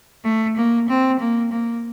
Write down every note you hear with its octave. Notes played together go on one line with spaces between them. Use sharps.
A3
A#3
C4
A#3
A#3